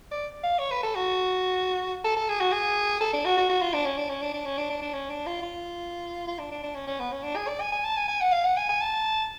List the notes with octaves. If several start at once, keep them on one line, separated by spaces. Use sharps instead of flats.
D5
F5
C#5
B4
A4
F#4
A4
A4
G#4
F#4
G#4
A4
D4
F#4
F#4
F#4
F4
D4
C#4
D4
C#4
D4
D4
C#4
D4
D4
D4
C#4
D4
F4
F4
F4
D4
D4
D4
C#4
C#4
B3
C#4
D4
G#4
D5
G#5
G#5
A5
G#5
G#5
F#5
F5
F#5
G#5
G#5
A5